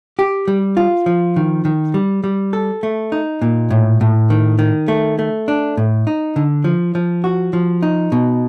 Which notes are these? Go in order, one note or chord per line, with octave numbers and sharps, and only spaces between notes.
G4
G3
F4
F3
D#3
D#3
G3
G3
A4
A3
D#4
A#2
A2
A2
D#3
D#3
A3
A3
D4
A2
D#4
D3
F3
F3
F#4
F3
D#4
B2